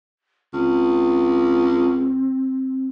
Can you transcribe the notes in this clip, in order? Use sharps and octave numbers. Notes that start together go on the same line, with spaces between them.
C#2 C4